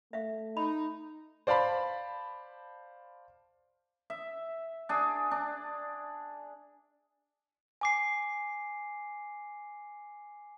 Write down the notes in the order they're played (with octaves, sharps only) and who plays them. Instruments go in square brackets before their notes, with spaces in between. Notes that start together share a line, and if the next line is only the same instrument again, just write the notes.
[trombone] A3 [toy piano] E5 F5
[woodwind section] D#4 [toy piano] B5
[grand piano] C5 D5 F5 A5 B5
[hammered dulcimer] E5
D4 G#4
D4
[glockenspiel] G#5 D6 C7